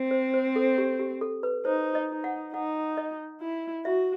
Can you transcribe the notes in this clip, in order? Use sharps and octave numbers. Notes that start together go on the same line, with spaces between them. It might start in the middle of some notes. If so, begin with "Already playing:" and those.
Already playing: C4
C5
C5
A4
G4
G4
A4
B4
D#4 C5
D#5
D#4
F#5
D#4 F#5
D#5
E4
F#4 E5